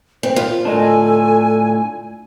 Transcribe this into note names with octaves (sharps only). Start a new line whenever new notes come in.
C4 C5
F4 A#4
A2 D4 A4 D#5 G#5
G#5